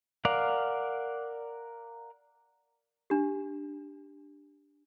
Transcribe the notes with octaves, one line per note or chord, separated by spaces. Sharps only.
A#4 D5 F5 F#5
D4 G4